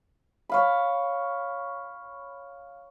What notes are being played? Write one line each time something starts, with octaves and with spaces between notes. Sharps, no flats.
C#5 F5 B5